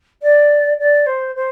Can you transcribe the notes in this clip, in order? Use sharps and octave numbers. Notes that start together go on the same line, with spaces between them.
D5
D5
C5
C5